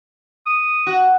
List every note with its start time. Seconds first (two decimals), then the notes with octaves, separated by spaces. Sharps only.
0.46 D#6
0.87 F#4